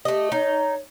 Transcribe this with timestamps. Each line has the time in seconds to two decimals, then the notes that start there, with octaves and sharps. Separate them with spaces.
0.05 A3 G4 D#5
0.32 D#4 C#5